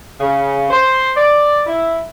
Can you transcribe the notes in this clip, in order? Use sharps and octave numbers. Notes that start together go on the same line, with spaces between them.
C#3
C5
D5
E4